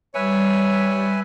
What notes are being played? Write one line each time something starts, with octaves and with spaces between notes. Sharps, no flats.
G3 B4 C#5 E5 G#5